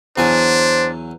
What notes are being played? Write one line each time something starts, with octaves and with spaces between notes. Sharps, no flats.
E2 F#3 D4 C5 G#5